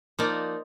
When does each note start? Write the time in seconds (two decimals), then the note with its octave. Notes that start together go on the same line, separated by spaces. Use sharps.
0.19 F3 A#3 D#4 A#4 D5